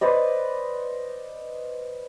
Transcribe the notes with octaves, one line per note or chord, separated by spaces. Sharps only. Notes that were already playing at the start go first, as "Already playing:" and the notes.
B4 C5 D5 D#5